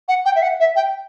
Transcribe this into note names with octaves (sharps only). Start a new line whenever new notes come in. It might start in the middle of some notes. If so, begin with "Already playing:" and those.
F#5
G5
E5
F#5
E5
G5